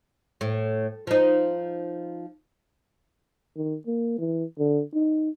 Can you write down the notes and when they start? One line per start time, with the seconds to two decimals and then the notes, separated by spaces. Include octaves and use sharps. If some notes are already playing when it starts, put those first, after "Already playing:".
0.41 A2
1.07 F3 D#4
3.57 D#3
3.86 A#3
4.19 E3
4.58 D3
4.94 D#4